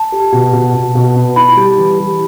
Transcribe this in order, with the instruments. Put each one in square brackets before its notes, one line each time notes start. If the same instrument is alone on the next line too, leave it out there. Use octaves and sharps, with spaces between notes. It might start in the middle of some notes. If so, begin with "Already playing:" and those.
Already playing: [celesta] A5
[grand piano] G4
B2
B2
B2
B2
B3
[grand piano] E4 [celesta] B5
[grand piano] G3
E3
G3